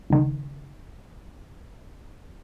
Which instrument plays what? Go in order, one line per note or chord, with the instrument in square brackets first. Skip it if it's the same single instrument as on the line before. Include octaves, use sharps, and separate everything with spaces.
[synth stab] C#2 D#3